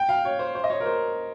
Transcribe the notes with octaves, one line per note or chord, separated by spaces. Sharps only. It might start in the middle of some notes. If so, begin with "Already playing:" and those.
Already playing: G5
F5
C#5
C5
C5
D#5
C#5
A#4
C5